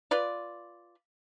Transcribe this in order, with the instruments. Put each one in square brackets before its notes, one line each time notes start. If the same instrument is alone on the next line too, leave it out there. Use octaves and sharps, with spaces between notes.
[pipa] F4 B4 D5